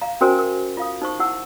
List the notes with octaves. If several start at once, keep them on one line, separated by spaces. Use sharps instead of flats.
F5 A#5
C#4 F#4 A#4 C5 G#5
A#4
F4 F5 D#6
D#4 C5 C#6
E4 F#5 E6